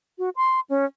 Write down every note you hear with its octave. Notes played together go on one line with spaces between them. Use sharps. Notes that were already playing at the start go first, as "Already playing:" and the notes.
F#4
C6
C#4